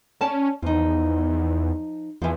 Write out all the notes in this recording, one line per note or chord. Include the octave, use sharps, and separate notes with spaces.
C#4 D5 A5
E2 F3 D#4
E2 E3 F3